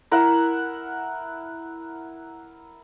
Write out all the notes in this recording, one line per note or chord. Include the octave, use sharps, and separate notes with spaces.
E4 A#4 F#5